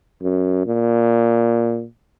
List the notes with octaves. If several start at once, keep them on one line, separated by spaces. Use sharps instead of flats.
F#2
A#2